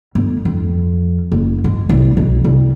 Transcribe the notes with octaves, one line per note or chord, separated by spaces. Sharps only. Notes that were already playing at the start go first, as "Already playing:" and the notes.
G1
F2
F#1
G#2
C2
B1
C2